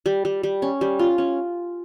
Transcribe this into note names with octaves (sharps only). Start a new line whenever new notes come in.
G3
G3
G3
C#4
G3
F4
C#4